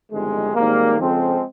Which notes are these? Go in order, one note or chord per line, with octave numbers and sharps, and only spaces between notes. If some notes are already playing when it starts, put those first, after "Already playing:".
G1 F2 C3 D#3 G#3
G#1 G#2 D#3 G3 A#3
F2 C#3 F3 G#3 C4